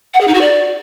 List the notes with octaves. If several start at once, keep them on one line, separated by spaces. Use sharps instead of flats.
F#5
G#4
D#4
F#4
D5